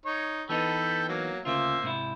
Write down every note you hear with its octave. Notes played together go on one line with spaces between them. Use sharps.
D#4 C#5
E3 B3 D#4 A4 G5 B5
F#3 A#3
D2 C#3 A#3 F4 C5 E5
G#2 C3 E4